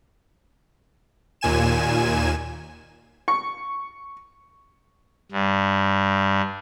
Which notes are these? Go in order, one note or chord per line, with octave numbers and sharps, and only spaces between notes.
D#2 A#2 G#5 E7
C#6
G2